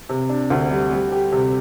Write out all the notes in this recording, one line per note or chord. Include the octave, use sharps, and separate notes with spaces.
C3
D4
D2
G3
G3
G4
C3